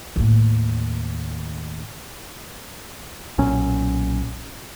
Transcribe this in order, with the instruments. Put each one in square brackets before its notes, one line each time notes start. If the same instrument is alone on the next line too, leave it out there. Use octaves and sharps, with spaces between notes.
[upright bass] D#2 A2
[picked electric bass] B1 A#2 F#3 C#4